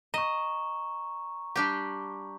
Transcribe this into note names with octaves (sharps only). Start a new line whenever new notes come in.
D#5 A#5 C#6
G3 D4 G4